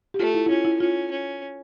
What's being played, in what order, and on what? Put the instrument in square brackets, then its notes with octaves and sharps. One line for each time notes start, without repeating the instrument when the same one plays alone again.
[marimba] G4
[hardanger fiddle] A3 [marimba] F4
[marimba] E4
E4
[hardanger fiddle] C#4 [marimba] F4
[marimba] E4
[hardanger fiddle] C#4 [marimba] F4
[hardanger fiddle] C#4